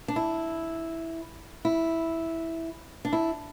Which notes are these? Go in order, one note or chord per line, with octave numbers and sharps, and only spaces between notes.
D4
E4
E4
D4
E4